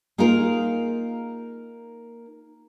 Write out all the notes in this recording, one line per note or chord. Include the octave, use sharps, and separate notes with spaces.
A#3 D#4 F4 G#4 A#4